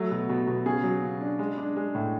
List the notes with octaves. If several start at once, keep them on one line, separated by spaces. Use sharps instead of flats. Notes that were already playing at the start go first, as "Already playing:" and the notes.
Already playing: F#3 A3
B2
B2
B2
C#3 G#4
F#3
C#3
D4
G#3
D4
G#3
A2